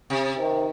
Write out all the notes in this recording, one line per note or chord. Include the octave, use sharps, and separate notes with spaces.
C3
C3 D#3